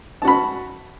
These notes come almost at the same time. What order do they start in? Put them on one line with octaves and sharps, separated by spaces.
A5 F#4 B5